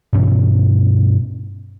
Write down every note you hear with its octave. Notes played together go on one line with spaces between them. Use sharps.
G2 B2 E3 C#4